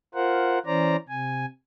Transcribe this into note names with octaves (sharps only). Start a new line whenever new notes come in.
F4 A#4 C5 F#5
E3 C#4 C5 D5 A#5
C3 G#5